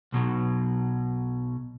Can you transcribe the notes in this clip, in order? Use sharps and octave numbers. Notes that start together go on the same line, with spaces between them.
B1 B2 F#3